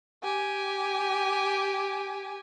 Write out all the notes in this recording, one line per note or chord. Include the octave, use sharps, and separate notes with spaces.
G4 G#5